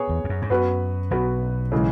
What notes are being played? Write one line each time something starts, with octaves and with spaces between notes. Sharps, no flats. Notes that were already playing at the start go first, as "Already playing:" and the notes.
Already playing: B3 G#4 C#5
E2
E2
F#2
G#2
F#2 B3 F#4 B4
B1 B2 B3 F#4 B4
C#3 E3 G#3